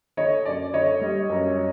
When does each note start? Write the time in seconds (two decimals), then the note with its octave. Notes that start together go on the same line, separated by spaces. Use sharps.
0.17 D3 C#5 D#5
0.45 F#2 D5
0.73 D3 C#5 D#5
1.01 G3
1.30 F#2